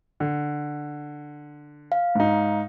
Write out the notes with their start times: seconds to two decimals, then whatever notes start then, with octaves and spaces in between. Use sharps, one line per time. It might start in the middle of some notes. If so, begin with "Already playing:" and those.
0.20 D3
1.92 F5
2.15 G#2 D#4